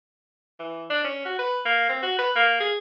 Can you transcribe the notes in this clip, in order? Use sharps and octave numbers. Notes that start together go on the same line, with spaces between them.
E3
D4
C#4
F#4
B4
A#3
C4
F#4
B4
A#3
G#4